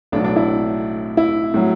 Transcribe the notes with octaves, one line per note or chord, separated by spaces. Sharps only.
B1 A2 F#3 D4
D4
E4
E4
A2 F#3